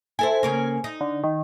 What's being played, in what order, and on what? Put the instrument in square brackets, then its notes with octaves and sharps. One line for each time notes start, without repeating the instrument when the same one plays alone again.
[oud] E4 A4 C5 [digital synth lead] G#5
[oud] C#3 A#3 C#4
D#4
[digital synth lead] D3
D#3